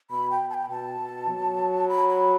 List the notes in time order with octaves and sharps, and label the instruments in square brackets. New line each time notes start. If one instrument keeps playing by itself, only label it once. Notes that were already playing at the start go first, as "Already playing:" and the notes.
[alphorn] B2 [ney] B5
[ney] G5
A5
G5
[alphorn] B2 [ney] A5
[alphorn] B2
F#3
[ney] B5
B5